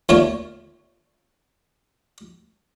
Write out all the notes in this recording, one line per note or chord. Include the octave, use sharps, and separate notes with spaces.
D#2 D3 A3 F4 C#5